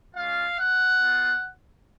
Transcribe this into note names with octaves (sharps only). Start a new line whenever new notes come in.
G#3 C#4 F4 F5
F#5
B3 F4